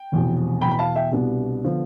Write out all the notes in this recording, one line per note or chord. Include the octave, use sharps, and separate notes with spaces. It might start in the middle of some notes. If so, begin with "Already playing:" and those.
Already playing: G5
F1 E2 B2
E2 B2 B3 G5 B5
B5
F5 A5
E5 G5
C2 B2 G3 B3 D4
D3 F3 B3